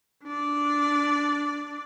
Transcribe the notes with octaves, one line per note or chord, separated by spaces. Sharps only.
D4 D5